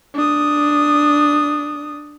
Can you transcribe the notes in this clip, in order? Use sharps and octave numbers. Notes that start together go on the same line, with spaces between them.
D4 D#6